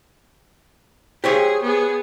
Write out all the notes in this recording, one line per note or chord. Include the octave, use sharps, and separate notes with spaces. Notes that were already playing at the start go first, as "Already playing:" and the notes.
G4 G#4 C5 C#5
B3 G#4